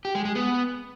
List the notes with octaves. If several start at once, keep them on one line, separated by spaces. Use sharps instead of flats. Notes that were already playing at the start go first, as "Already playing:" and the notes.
G4
G#3
G#3
B3